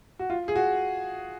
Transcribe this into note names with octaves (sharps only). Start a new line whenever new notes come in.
F#4
F4
G#4
F#4